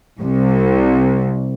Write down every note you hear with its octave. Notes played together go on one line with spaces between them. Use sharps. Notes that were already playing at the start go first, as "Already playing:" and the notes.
C2